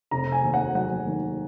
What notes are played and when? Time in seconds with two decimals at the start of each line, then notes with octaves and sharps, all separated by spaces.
0.11 F1 A#5
0.32 G#5
0.43 D#2
0.54 F#5
0.75 F#3 F#5
1.06 D#3